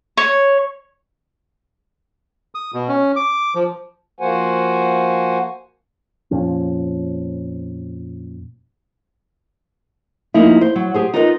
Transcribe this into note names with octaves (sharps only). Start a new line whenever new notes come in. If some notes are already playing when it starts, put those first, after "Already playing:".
C#5
D#6
B2
C#4
D6
F3
F3 A#3 F#4 C5 F#5 G#5
F2 A#2 F3 C#4
F3 A#3 D#4 E4
C5
F#3
G4 G#4 C5
D#4 F4 A#4 B4 C#5 D#5